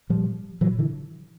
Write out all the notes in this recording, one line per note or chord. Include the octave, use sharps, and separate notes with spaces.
A#2 F3 G3
A#2 E3 F#3
D3 E3